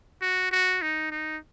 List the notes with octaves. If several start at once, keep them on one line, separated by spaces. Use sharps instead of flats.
F#4
F#4
D#4
D#4